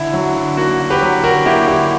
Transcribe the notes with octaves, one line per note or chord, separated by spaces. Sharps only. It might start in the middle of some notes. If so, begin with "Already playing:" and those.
Already playing: D3 E4
F#3
D3
A#3 F#4
D3
G4 B4
F#3
D3 F#4 A#4
A#3 E4 G4
D3 E4 G4